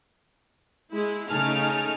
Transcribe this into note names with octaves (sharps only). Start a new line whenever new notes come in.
G#3 E4
C#3 A3 D#4 G#5 A5 F6